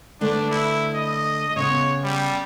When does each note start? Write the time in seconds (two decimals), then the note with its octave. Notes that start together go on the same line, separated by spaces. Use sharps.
0.21 D3 A3 D4 B4
0.50 E4
0.94 D#5
1.56 C#3 B3 C#5
2.03 G3